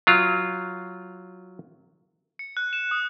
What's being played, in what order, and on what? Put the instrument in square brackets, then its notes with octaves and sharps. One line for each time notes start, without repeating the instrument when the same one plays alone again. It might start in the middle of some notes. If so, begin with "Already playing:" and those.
[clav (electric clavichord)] F#3 F4
[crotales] C#7
F#6
E7
D#6